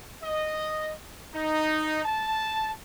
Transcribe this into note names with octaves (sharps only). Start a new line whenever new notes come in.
D#5
D#4
A5